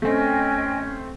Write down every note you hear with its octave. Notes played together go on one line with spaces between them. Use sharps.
A3 C4 C#4 D#5 G5 G#5